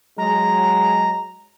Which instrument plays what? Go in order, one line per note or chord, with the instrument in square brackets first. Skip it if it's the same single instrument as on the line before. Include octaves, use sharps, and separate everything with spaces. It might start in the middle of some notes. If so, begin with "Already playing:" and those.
[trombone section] F#3 G#3 [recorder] A#5